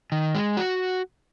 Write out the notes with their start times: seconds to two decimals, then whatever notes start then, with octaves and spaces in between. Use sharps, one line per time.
0.12 D#3
0.35 G#3
0.57 F#4